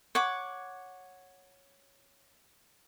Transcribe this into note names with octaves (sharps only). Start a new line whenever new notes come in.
C#5 F#5 D6